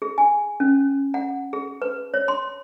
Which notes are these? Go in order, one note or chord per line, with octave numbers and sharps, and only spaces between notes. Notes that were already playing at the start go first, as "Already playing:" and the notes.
G#4
G#5
C#4
F#5
G#4
B4
C#5
C6